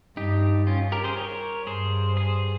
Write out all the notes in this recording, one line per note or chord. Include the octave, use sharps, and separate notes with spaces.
G2 D#4 G4
C#4 F4
G4 A#4
G#4 C5
A#4 C#5
G2 G#4 C5
G#4 C5